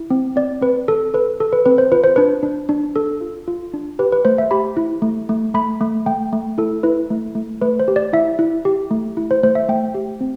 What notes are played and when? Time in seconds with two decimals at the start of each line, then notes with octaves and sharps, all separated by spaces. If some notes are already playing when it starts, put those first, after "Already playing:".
Already playing: E4
0.10 C4
0.36 C4 D5
0.62 C4 B4
0.88 A4
1.14 A4 B4
1.40 A4
1.53 B4
1.66 C4 B4
1.78 C5
1.92 F4 B4
2.04 C5
2.16 D4 B4
2.43 D4
2.69 D4
2.96 D4 A4
3.21 F4
3.47 F4
3.74 D4
3.99 G4 B4
4.12 B4
4.25 A3 C5
4.38 E5
4.51 G4 B5
4.77 E4
5.02 A3
5.29 A3
5.54 A3 B5
5.81 A3
6.06 A3 G5
6.33 A3
6.58 E4 A4
6.83 E4 B4
7.10 A3
7.35 A3
7.62 A3 B4
7.80 C5
7.88 G4
7.96 D5
8.13 E4 E5
8.39 E4
8.65 G4
8.91 A3
9.17 E4
9.31 C5
9.43 A3 C5
9.55 E5
9.69 A3 G5
9.95 G4
10.21 C4